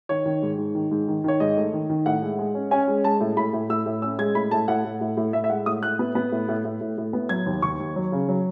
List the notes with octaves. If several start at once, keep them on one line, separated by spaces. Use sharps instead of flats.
D#3 C#5
D#3
G#2
G#2
D#3
G#2
D#3
D#3 C#5
G#2 D#5
A3
D#3
D#3
A2 F#5
G#3
G#3
C#4
C#4 G#5
G#3
G#3 A5
A2
A2 B5
A2
A2 E6
A2
C#4 E6
G#3 G#6
A2 B5
A2 A5
A2 F#5
A2
A2
A2
A2 E5
E5
G#3 F#5
A2 D#6
A2 F#6
B3
B3
A2
A2
A2
A2
A2
B3
F#3 G#6
D#2
D#2 C#6
D#2
F#3
C#3
F#3